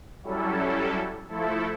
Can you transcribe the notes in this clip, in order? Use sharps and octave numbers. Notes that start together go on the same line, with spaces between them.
F#3 G3 C#4 E4 A4
F3 A3 E4 A4